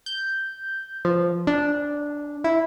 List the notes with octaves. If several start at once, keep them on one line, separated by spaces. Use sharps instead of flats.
G6
F3
D4
E4